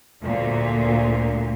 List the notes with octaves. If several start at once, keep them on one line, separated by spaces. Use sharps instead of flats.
D2 A#2